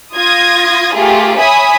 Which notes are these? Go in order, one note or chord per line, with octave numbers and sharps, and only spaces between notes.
F4 D#6 G#6 A#6
A3 F4 G4 G#4 A#4
C#5 E5 G#5 B5 D#6